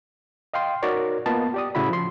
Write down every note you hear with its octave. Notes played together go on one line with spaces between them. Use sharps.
D#5 F5 G5 C6
D#4 F#4 A#4 C#5 D5
A#3 B3 F4 D#5 A5
G4 D5 D#6
A2 C#3 E4 F#4 B5
F3 C6